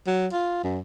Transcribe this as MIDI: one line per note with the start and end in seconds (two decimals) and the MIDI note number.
0.07 0.27 54
0.32 0.61 65
0.63 0.80 42